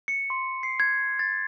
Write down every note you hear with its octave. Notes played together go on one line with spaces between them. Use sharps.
C#7
C6
C7
G#6
A6